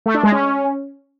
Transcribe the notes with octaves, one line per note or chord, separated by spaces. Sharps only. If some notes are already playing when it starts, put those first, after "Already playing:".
A3
D4
G#3
C#4